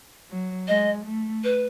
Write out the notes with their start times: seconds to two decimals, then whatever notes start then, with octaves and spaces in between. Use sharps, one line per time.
0.30 F#3
0.68 G#3 D#5
1.06 A3
1.44 B4